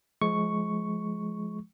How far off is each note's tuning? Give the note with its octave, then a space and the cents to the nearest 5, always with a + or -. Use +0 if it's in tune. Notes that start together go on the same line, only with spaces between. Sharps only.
F3 +0 G#3 +25 C#6 +0